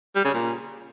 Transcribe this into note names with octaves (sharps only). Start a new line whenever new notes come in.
G3
C#3
A#2